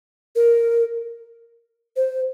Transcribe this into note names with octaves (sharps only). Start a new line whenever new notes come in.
A#4
C5